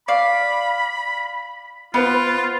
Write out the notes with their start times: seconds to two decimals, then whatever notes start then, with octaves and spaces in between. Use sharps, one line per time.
0.08 D5 F5 B5
1.94 B3 F4 B4 C5 B5